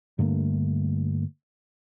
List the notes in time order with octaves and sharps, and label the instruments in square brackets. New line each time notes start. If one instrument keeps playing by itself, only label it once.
[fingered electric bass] G2 D3 A3 A#3